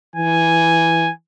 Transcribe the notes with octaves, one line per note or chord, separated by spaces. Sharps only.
E3 G#5